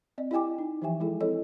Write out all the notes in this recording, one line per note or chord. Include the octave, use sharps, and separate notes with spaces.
C4 D5 D#5
E4 G4 D#5 G5 G#5 D6
D#4
E3 F3 G4 E5 G5 G#5
G#3 E4 G#4 A4
C4 E4 A4 C#5 D#5